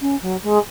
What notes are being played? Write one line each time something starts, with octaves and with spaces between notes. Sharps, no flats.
C#4
F#3
G#3